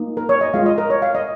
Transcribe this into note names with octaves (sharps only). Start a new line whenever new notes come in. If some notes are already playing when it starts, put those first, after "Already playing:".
Already playing: A#3 D#4
A#4
C#5
D#5
G#3 F4 F5
D#5
A#4
C#5
F5
D#5